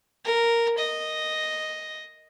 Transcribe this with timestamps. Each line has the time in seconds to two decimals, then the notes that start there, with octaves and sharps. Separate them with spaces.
0.25 A#4
0.78 D#5